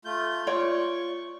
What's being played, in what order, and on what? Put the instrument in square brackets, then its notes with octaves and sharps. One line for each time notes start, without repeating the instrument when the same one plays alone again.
[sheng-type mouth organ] A3 F4 G6
[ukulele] F4 C#5 D5 [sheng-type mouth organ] C#6